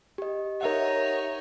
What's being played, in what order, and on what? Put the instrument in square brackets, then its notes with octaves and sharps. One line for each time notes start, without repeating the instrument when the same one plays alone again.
[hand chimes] G4 D#5
[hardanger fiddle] D#4 C#5 [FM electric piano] A#4 E5 F#5